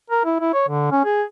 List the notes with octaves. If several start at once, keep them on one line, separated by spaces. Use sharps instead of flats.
A#4
E4
E4
C#5
D3
C#4
G#4